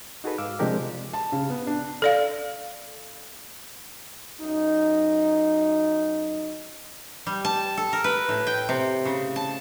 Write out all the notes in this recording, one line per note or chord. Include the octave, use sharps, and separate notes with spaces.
D#4 F#4 G#4 A4 B4
G#2 F5 D6 E6 F6
C3 F3 G#3 D4 G4 A#4
A5
C#3
B3
D4
A4 D5 F5
F#2 D#4
G3
A5
A4
A#4
B4
A2
G5
C3
C#3
A5